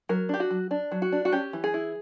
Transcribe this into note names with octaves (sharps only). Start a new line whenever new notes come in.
F#3 A#4
D4 G4
F#4
F#3
D4
F#3
F#4
D4
F#4
C#4 G4
E3
G#4
E4